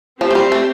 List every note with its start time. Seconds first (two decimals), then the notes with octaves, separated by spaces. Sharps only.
0.21 F3 C4 G4 C5
0.31 A3
0.35 G3
0.52 A3